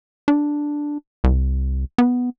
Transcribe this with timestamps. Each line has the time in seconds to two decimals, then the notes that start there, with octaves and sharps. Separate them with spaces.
0.28 D4
1.24 C2
1.98 B3